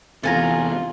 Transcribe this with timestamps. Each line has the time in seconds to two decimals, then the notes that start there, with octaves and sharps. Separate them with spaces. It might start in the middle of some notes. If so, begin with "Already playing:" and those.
0.24 E2 C3 F4 A4 G#5 A#5